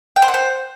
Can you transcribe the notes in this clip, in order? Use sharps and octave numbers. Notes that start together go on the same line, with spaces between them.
G5
C5
F#5
C5